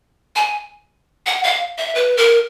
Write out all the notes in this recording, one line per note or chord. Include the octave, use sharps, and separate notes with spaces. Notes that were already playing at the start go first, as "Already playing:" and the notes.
G#5
F#5
F5
E5
B4
A#4